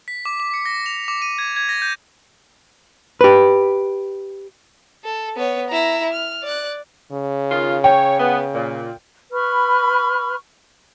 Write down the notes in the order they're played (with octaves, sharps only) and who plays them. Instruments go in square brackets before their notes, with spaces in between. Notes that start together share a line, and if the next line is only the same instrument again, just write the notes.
[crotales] B6
D6
D6
C#7
A#6
F7
D6
D#7
G#6
G#6
A#6
G6
[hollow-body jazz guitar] G4 B4
[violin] A4
B3 C#5
E4 A#5
F6
D5 F#6
[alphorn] C#3
[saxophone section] D#3 F4
[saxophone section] C#5 [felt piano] G5
[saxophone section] B3
A#2
[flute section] B4 B5 C#6 F6